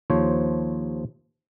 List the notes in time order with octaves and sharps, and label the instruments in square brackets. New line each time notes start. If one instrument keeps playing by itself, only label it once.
[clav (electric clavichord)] D#2 F3 C5 C#5